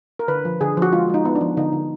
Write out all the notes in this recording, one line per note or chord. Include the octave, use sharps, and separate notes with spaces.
A#4
D3 B4
F3
D3 G#4
F3 F#4
G#3 F4
G#3 D#4
B3
D4
F3
D3 D#4
D3